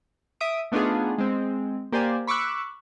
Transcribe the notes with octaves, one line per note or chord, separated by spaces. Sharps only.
E5 D#6 D7
A3 B3 D4 D#4 F4 G#4
G#3 C4
A#3 G4 C5 D5 G#5
B5 C#6 D6 E6 F#6